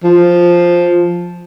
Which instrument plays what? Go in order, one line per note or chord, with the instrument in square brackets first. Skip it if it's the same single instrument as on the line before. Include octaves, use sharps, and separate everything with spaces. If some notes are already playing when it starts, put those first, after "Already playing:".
[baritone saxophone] F3